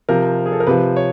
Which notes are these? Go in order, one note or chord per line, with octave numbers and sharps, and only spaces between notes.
C3 F3 A#4
G#4
A4
A#4
C3 F3 B4
C#5